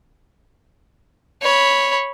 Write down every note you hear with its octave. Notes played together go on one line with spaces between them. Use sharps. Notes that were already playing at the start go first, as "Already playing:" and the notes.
C#5 B5